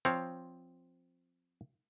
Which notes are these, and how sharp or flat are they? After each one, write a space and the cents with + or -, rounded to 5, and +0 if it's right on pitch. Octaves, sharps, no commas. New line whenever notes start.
F3 +0 C4 +0 C#5 +10